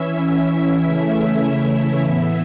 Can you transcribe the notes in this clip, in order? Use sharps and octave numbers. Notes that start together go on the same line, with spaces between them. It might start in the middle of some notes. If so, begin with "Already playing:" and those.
Already playing: E3 C#4 E4 E5
C#3 E3 A3 C#4 E4 E5
A2 E3 B3 E4 E5